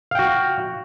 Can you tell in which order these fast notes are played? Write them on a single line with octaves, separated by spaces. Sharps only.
F5 G5 F#4